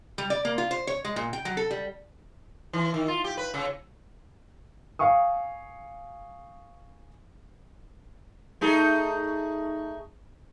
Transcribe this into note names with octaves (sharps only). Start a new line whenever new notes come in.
G3
D5
A#3
F4
C5
C#5
G#3
A#2
G5
F#3
A4
G3
E3
D#3
F4
G4
B4
C#3
F5 G#5 C#6 D#6
A3 D#4 G#4